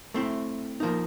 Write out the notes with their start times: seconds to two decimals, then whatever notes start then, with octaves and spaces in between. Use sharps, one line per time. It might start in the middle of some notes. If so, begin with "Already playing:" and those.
0.14 A3 C4 E4
0.80 F3 A#3 D#4